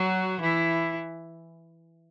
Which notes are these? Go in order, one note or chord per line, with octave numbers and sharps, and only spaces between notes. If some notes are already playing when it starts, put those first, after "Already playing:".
Already playing: F#3 F#4
E3 E4